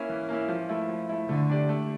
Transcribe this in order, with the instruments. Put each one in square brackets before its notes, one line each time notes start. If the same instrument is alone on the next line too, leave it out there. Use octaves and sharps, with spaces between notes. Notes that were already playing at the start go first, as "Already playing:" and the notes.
Already playing: [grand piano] A#3 C#4 E4
E3
A#3 C#4 E4
F3
A3 E4
F3
A3 E4
[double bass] D3 [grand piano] A3
[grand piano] D4 G4 D5
A3